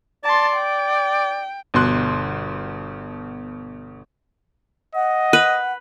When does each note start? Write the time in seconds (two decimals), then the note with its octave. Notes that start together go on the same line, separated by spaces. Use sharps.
0.24 D5 A5 C6
0.58 G5
1.74 G1 B2 C6 F#6
4.95 D#5 F#5
5.33 B4